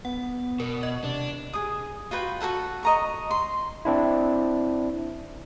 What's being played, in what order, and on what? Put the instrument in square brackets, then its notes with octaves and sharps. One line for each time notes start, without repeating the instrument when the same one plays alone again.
[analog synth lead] B3 [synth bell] F#5
[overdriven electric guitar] B2 [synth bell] A#4 [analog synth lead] D5
[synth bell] D#5 [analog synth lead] F#5
[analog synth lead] C3 [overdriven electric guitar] D4
[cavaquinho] G#4 D#6
F4 F#4 B4 G5
F#4 G#4 A4 F#5
D#5 A#5 C#6
C6
[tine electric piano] C4 D4 E4